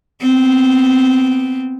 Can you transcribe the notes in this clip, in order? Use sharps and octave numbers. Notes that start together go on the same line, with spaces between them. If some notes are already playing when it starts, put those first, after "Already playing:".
B3 C4